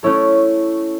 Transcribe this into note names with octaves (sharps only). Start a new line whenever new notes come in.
A3 C#4 E4 A4 C#5